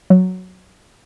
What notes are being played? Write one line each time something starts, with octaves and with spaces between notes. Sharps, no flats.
F#3